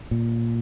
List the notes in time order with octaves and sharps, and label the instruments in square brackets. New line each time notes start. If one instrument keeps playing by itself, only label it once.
[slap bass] A#2